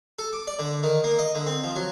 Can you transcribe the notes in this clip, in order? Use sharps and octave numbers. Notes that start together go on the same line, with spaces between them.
A4
D6
D5
D3
D#3
A#3
D#5
D3
C4
F3
F#3